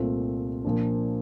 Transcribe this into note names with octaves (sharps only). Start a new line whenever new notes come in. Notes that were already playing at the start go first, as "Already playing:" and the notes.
Already playing: C2 A#2 A3 C4 F4
A#2 F3 A#3 D4